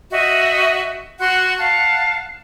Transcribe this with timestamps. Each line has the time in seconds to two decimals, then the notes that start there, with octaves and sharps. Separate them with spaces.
0.11 F#4 D#5 E5 G5
1.20 F#4 F#5 C6
1.58 F5 F#5 A5